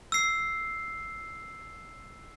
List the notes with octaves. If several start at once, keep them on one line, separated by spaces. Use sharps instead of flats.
E6 C7